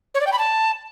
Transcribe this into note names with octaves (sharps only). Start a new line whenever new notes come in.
C#5
D5
G5
B5
A5